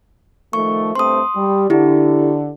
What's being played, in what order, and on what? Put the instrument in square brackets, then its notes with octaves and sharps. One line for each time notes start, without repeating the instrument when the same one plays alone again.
[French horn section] D#3 F3 A3 [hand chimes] C#6
[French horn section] G2 A3 C4 [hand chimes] C6 D#6
[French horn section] G3
[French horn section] D3 [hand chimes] E4 G4